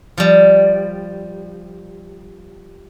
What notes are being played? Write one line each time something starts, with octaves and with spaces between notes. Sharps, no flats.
F3 G3